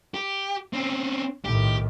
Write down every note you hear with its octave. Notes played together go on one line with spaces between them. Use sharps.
G4
C4 C#4
B1 A2 D#3 G4